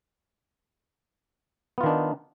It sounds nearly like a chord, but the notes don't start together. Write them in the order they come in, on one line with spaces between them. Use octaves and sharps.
B3 F4 D#3 D4 D#4